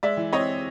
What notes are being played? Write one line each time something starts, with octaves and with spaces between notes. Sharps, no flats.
G#3 D5 E5
E3
C4 C#5 D#5